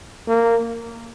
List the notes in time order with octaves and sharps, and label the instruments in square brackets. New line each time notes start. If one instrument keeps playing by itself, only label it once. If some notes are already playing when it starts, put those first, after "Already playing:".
[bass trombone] A#3